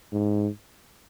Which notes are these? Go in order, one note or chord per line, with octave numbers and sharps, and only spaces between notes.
G#2